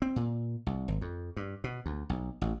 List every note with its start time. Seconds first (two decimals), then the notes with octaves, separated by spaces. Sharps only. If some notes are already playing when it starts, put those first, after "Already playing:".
0.02 C4
0.16 A#2
0.67 C2
0.88 G#1
1.01 F2
1.37 G2
1.64 B2
1.86 D2
2.10 B1
2.41 A1